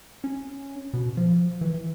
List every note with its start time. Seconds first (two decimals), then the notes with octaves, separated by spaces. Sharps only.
0.24 C#4
0.94 B2
1.17 F3
1.61 E3